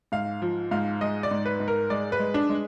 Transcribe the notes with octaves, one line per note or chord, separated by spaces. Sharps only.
G#2 F5
F3
G#2 F5
G#3 D#5
D5
G#2
B4
G#2
A#4
G#3 D5
B4
G#3
D4
G#3